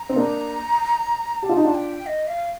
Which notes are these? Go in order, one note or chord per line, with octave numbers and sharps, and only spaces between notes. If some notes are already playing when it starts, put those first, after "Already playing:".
Already playing: A#5
C4
A#3 D4
G4 A5
F4
D#4
D4 F4
G5
D#5
F5